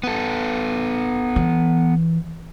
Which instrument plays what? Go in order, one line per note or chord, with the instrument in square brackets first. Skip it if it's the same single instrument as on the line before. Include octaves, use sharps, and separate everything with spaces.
[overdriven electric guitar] B3 A4
[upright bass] E3